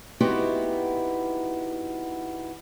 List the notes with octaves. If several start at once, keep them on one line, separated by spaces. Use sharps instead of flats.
B3 C4 D#4 E4 F#4 G4